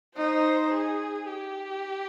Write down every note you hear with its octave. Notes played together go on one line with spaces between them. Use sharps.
D#4 C5
G#4
G4